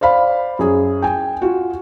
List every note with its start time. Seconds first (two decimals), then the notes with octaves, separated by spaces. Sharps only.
0.01 C5 D5 F5 B5
0.59 F#2 G#4
1.02 G5 G#5
1.42 F4 F#4